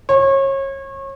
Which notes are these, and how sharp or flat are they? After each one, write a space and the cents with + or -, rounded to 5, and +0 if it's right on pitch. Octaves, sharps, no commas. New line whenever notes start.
C#5 -30